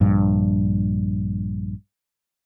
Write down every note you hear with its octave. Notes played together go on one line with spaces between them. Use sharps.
A#1 G2